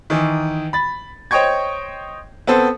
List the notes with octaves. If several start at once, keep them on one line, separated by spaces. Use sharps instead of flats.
D#3 E3
B5 A6
C5 C#5 D#5 G5 C#6 G#6
B3 C4 A4 C5